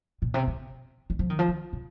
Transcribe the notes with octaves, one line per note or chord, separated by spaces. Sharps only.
A#2
C3
C#3
D#3
F3
D#3
F3
D#3
C#3